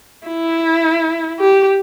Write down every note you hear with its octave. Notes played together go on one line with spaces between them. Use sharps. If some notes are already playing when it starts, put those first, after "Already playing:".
E4
G4